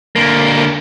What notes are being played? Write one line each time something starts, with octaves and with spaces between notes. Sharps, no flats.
D3 A#3